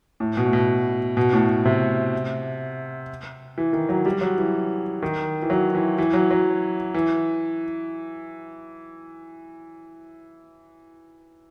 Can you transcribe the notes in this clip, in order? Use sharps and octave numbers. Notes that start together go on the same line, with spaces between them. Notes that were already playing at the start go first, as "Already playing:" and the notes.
A2
B2
A2
B2
B2
A2
C3
E3
D#3
F#3
G3
F#3
E3
D#3
E3
F#3
E3
E3
F#3
F#3
E3